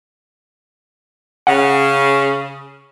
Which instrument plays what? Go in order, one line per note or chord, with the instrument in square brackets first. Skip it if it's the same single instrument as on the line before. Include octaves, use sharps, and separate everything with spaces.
[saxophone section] C#3 [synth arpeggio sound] F#5